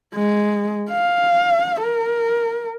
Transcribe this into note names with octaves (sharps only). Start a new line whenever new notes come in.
G#3
F5
A#4